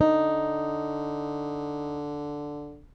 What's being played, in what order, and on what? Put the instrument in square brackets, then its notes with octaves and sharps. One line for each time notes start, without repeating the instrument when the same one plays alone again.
[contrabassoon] D3 [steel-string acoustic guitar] D#4